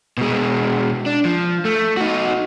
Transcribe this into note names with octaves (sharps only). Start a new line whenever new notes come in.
B2 G#3
D4
F3
A3
D#4 F#4